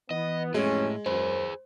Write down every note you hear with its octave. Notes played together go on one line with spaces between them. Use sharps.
E3 B3 D#5
A1 F2 A2 G#3 C#4
F#2 G#4 B4 C5